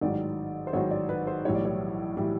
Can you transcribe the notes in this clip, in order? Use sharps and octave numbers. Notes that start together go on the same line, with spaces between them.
A1 G#2 D#3 F#3 D5
C5
A1 G#2 D#3 F#3 C#5
D5
B4
C5
B1 A2 E3 G3 C#5
D5
C#5
A2 E3 G3